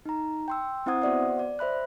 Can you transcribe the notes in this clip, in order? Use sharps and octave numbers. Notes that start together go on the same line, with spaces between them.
D#4 A#5
G5 C6 E6
C4 E4 C5 F#5 D#6 G#6
B3 F#4 C5 D5 E5 F#5
D5
C5 E5 B5 F#6